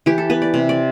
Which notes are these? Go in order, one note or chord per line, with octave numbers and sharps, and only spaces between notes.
E3 G4
A4
B3 B4
D5
C3
D5